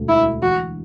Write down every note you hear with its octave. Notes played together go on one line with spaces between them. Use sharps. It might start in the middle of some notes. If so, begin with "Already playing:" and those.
Already playing: E1 D2 A3
D3 E4
E3 F#4